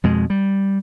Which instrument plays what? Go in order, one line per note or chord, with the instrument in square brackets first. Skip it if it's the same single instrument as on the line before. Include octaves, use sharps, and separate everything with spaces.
[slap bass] F2 B2 G#3
G3